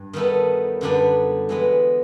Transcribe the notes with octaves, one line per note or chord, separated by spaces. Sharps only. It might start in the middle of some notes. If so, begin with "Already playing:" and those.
Already playing: G2
D#3 G3 B3 E4 A4
F#2 D3 G3 B3 D4
E3 G#3 B3